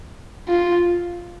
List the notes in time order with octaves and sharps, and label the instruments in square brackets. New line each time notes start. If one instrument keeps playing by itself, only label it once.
[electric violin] F4